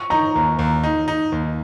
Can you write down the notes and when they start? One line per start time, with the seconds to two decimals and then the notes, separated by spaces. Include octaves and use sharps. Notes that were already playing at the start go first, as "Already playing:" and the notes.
Already playing: C#6
0.10 D#4 A#5
0.35 D#2
0.59 D#2
0.83 D#4
1.08 D#4
1.32 D#2